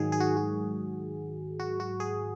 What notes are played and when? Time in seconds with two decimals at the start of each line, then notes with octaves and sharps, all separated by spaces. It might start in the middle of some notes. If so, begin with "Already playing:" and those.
Already playing: G#2 D#3 F#3 G#4
0.12 G#4
0.20 F#4
0.37 F#4
1.59 F#4
1.80 F#4
2.00 G#4